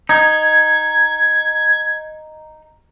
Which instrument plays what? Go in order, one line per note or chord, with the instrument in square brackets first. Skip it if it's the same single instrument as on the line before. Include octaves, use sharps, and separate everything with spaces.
[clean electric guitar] D#4 [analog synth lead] G#6